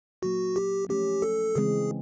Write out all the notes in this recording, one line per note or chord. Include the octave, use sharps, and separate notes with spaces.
A#2 F#3 A#3 F#4
G4
F3 A3 C#4 G4
A4
C#3 E3 G#3 C4 G#4